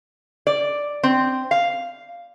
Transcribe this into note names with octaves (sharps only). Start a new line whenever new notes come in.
D5
C4
F5